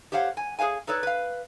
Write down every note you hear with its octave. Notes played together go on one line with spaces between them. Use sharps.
G4 C5 C#5 F5 F#5
G#5
G#4 C5 C#5 F5 G#5
D#4 A4 B4 C#5 D5
B4 F5